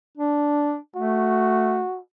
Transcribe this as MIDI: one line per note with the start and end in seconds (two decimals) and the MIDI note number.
0.17 0.77 62
0.96 1.83 57
0.96 2.00 66